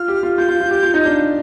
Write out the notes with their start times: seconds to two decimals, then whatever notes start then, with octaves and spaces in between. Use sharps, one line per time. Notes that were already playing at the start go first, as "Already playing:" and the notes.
Already playing: F4 F6
0.08 G4
0.23 F4
0.38 F4 G6
0.49 F4
0.60 F4
0.71 G4
0.83 F4
0.94 D#4
1.05 D4